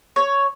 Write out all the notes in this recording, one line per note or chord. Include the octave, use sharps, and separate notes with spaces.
C#5